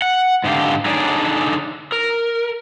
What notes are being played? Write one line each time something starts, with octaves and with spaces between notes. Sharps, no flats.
F#5
G#2 D3 G4 F5
D3 D4 D#4 G#4 C#5 D5
A#4